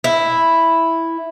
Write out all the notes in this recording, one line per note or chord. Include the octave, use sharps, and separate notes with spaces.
E4